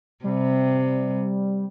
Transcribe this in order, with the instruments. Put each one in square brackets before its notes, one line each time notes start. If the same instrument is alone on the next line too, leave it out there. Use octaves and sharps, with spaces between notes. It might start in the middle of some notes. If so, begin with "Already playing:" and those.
[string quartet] C3 [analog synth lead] G3